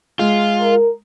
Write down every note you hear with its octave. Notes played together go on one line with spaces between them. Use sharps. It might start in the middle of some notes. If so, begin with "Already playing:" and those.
G#3 F4
A#4